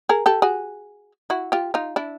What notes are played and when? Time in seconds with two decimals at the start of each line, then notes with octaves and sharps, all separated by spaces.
0.09 G#4 A#4
0.26 G4 A4
0.42 F#4 G#4
1.30 E4 F#4
1.52 F4 G4
1.74 D#4 F4
1.96 D4 E4